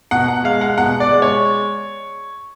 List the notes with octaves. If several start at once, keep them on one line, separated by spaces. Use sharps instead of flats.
B2 F#5
F#5
G#3 F5
F#5
B2 F#5
D5
G#3
C#5